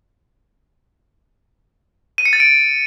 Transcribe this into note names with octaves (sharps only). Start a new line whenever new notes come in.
D#7
C#7
A6
D7